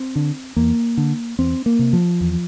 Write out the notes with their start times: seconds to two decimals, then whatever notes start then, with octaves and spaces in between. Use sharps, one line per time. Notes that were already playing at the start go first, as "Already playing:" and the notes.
Already playing: C4
0.16 D3
0.56 E2 A#3
0.97 D3
1.39 E2 C4
1.66 A#3
1.79 C3
1.93 F3
2.21 E2